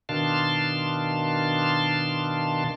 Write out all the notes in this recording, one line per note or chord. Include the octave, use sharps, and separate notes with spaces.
B2 D#3 D4 F5 A5 C6